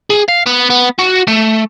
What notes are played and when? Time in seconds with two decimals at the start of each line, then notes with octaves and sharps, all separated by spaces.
0.10 G#4
0.28 F5
0.46 B3
0.70 B3
0.99 F#4
1.28 A3